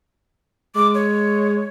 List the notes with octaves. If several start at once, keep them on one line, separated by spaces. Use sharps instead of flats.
G#3 D6
C#5